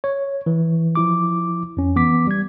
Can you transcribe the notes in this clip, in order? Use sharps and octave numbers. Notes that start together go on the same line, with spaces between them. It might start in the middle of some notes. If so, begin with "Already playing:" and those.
C#5
E3
F3 E4 D6
F2 C#4
E3 B3 D6 B6
G3 G#6